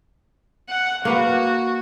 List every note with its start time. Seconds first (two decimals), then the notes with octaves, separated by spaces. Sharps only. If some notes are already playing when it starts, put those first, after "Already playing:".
0.69 F#5
1.05 A#3 F#4 B4 F#5